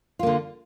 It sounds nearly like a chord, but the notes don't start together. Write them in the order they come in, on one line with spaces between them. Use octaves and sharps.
F4 A#3 D3